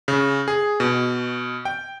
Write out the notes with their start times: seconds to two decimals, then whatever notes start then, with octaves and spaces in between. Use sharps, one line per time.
0.08 C#3
0.48 G#4
0.80 B2
1.65 G5